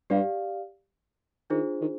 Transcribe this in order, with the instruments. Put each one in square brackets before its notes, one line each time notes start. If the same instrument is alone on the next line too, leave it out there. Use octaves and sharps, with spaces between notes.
[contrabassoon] G2 [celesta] G4 D5 F5
[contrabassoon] D#3 [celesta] D4 F4 G#4 C5
[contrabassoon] D#3